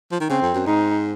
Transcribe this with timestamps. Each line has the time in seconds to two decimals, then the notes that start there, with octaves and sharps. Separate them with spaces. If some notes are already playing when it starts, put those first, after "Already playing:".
0.11 F3
0.20 D#3
0.29 C#3 C4
0.42 F2
0.54 F#2
0.66 G#2 D#4